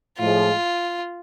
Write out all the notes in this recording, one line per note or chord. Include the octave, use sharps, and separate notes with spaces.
A2 F3 G#3 F4